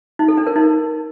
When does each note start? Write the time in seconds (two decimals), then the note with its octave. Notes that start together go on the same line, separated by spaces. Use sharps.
0.19 D#4
0.28 A4
0.37 D4
0.47 A#4
0.56 D#4